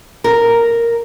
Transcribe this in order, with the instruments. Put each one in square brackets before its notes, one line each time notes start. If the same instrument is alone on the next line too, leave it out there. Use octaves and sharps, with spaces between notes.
[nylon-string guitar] A#4